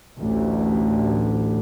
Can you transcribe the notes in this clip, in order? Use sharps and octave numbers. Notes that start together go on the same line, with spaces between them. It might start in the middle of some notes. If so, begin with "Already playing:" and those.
A1 D2